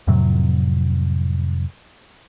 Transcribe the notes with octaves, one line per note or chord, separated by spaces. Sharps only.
F2 A2 C3 F#3